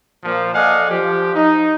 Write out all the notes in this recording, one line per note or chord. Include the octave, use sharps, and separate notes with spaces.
A#2 F3
A4 D5 D#5 F5 F#5 G#5
F3 G4
D#4